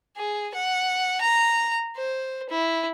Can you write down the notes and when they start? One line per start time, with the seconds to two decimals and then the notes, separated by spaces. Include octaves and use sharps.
0.17 G#4
0.54 F#5
1.21 A#5
1.96 C5
2.50 E4